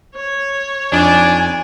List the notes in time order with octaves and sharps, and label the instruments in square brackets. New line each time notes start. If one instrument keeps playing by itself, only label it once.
[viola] C#5
[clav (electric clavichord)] F2 D#4 [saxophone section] D4 [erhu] G#5